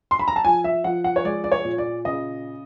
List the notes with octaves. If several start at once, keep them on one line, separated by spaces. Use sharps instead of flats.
C6
B5
A#5
A5
F3 G#5
E5
F3 F#5
F#5
C#5
G#3 D5
D5
C#5
A#2
D5
C#3 D#5